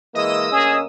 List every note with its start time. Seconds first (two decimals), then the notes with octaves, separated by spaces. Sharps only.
0.15 E3 G#3 A#3 D#5 D#6 E6
0.52 D2 A#3 C#4 G#4